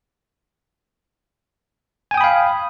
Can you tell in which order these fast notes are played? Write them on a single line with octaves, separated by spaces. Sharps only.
G#5 G5 D#6 B5 F5